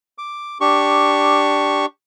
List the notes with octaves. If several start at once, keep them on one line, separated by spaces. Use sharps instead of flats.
D6
D4 G4 C#6